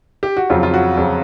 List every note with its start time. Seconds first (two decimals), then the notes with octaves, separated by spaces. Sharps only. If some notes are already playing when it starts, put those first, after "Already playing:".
0.23 G4
0.37 F#4
0.50 F2 C#3 F#3 F4
0.63 F4
0.74 F#4
0.97 F2 C#3 F#3